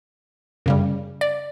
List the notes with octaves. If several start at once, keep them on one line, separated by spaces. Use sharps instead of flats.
F#2 C#3 G3
D5